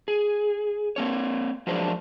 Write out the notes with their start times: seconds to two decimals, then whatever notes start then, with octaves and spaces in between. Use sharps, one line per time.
0.08 G#4
0.96 A#3 C4 C#5
1.67 F3 F#3 G#3 A#3 D4 C5